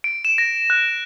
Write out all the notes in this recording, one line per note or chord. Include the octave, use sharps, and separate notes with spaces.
D7
E7
A#6
F#6